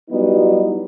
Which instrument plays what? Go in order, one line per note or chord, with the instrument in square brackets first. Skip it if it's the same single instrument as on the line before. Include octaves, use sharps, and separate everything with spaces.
[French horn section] F#3 G3 B3 D#4 E4 G4